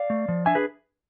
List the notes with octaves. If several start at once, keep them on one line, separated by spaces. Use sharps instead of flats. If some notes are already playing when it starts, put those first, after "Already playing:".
Already playing: D5 F5
A3
F3
D4 E5 G#5
G#4 B4